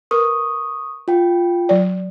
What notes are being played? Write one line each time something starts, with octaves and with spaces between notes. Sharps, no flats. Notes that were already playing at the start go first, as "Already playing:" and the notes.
A#4 B4 C#6 D#6
F4 G5
F#3 D5